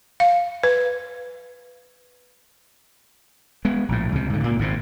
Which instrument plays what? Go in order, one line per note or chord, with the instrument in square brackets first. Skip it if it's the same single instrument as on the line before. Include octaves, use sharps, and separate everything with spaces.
[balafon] F5
B4
[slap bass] G#3 B3
A#1 A2
C#2 C3
G#2 D3
A#2 A#3
G#1 G#2 C3